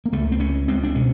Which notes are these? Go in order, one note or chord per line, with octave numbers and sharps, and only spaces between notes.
A#3
C#2 A3
C4
C#2 C#4
C#2 C4
D4
B2 C#4